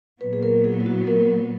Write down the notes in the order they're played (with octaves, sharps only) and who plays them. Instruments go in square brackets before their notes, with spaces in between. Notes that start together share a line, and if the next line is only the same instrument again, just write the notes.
[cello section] A#2 F#3 B3 [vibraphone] B4
[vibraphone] G#4
A#4
G#4
E4
F#4
A#4